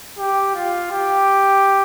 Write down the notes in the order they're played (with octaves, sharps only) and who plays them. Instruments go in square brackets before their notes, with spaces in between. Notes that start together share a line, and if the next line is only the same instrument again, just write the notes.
[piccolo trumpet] G4
F4
G4